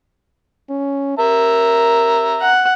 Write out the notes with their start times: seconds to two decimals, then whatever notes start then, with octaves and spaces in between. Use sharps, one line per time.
0.69 C#4
1.19 A#4 E5 A#5
2.41 F#5